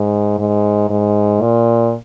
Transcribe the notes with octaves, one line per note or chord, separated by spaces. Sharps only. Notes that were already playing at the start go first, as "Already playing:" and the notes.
Already playing: G#2
G#2
G#2
A#2